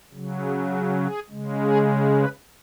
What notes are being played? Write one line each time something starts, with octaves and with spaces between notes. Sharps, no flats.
C#3 F#3
G#4
F#4
G#4
C#3 G#3
G#4
B4